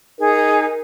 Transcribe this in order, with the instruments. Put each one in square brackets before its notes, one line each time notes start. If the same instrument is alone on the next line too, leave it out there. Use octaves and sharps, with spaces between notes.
[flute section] D#4 G#4 [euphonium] A#4